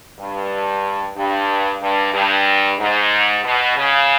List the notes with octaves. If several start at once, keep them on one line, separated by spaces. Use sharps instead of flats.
G2
G2
G2
G2
G#2
B2
C#3